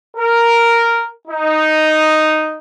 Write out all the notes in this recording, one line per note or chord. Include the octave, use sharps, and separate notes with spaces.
A#4
D#4